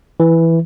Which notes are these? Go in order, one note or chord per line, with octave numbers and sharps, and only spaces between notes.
E3